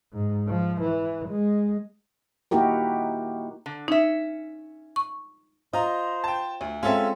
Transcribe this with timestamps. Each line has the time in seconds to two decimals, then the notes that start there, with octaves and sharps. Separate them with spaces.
0.13 G#2
0.48 F3
0.81 E3
1.28 G#3
2.51 A#3 D#4 E4 F#4 G4 A#4
3.66 D3
3.88 C#4 D#4 E5
4.96 C#6
5.73 F4 C5 D#5 A#5
6.24 G5 A5
6.61 D2
6.83 G#3 C4 C#4 F4 A4 E5